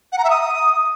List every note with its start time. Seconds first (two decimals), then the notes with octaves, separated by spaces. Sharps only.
0.12 F#5
0.18 A#5
0.24 E5
0.30 D#6